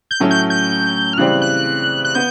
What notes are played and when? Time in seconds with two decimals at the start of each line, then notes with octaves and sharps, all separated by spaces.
0.11 G6
0.20 A2 F#3 A3 C#4
0.31 G6
0.50 G6
1.13 F6
1.18 C#3 E3 G3 C4 F#6
1.42 F#6
2.05 F#6
2.15 B3 G6